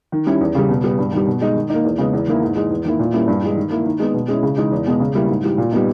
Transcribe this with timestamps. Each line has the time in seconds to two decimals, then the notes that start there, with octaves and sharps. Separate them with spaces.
0.12 D#3
0.27 G3 C#4 E4
0.41 E2
0.55 C#3 G3
0.69 B2
0.83 G3 B3
0.98 G2
1.12 D#3 G3
1.27 B2
1.41 G#3 D#4
1.56 D#3
1.70 A#3 D#4
1.84 E2
1.98 C#3 G#3 B3
2.13 E2
2.27 D#3 A#3 E4
2.42 G#2
2.56 E3 G#3
2.70 E2
2.85 D#3 A#3 E4
2.99 A#2
3.13 G3 A#3 C#4 E4
3.28 G2
3.43 E3 G#3
3.56 D#3
3.71 A#3 E4
3.85 D#3
3.99 G#3 B3
4.14 B2
4.28 G#3 C#4 E4
4.43 C#3
4.58 E3 G#3 D#4
4.72 E2
4.86 B2 G#3 B3
5.00 C#3
5.15 G3 A#3 E4
5.29 G#2
5.44 E3 G3
5.58 A#2
5.73 G3 B3 D#4